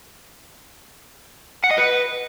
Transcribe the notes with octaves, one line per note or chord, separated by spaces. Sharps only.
F#5
D#5
B4